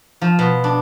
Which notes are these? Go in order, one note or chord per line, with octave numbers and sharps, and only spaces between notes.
F3
B2
D4